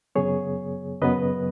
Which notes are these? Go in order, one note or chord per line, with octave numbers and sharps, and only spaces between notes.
F#2 C#3 F#3 B3 G#4 C#5
F#2 C#3 F#3 B3 B4 D#5